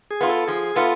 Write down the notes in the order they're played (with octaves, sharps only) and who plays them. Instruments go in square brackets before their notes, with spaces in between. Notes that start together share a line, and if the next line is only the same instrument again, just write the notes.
[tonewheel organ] G#4
[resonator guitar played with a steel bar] B3 F4
[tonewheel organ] A4
[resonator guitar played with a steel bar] F3 [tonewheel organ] G#4
[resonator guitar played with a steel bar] B3 F4 [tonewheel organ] A4